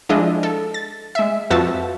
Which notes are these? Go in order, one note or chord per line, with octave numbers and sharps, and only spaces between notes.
F3 G#3 D4 E4 G#4 D#5
A4
A6
G#3 E5
F2 F3 F#4 B4 E5 A5